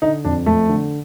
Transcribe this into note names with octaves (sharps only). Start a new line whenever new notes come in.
D3 D#4
F2 D4
F2 A3
D3